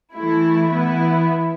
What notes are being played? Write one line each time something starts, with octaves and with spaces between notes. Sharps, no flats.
E3 A3 E4
E3 B3 E4